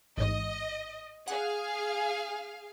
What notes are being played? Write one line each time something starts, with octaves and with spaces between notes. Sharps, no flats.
A1 G#2 D#5
G#4 F5 F#5